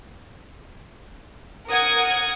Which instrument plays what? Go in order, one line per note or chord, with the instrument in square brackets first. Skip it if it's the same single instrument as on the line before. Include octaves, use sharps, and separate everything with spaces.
[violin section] A#4 F#5 D#6 G#6